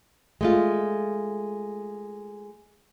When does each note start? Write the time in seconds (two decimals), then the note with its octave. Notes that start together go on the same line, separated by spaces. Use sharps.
0.41 G#3 A3 F4